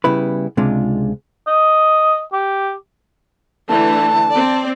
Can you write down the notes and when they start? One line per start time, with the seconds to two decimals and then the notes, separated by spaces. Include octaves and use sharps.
0.04 C#3 G3 B3 E4 B4
0.57 C#2 C3 G#3 D4 F4
1.47 D#5
2.33 G4
3.69 D3 E3 A3 A5
4.31 C4 D5